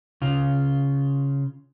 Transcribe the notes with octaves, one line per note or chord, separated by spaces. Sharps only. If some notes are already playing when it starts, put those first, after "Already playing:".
C#3 F4